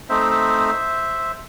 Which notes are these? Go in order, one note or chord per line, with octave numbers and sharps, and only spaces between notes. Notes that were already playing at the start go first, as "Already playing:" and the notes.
A3 C4 D#4 C5 E5